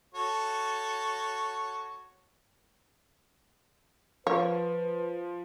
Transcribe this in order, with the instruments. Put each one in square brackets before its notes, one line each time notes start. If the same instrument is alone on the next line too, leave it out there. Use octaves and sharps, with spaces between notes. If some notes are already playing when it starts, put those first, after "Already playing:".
[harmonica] F#4 A4 C#5
[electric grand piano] F3 [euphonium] B4 [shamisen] C#5 [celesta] F5